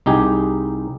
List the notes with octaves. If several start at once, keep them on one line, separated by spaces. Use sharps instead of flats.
C2 D#4 G4 G#4